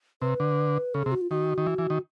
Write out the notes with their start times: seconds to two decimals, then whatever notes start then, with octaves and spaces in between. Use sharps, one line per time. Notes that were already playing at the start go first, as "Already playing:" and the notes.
0.22 C3 B4
0.40 D3
0.94 C#3 A4
1.03 C3 G#4
1.12 F#4
1.21 F4
1.30 D#3 F#4
1.58 D#3
1.66 E3
1.78 E3
1.90 D#3